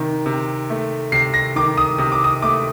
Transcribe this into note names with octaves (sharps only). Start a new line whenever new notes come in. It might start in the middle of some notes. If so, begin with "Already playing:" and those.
Already playing: C3 D#3
C3
A3
C3 C7
A#6
D#3 D6
D#6
C3 D#6
D6
D#6
A3 D6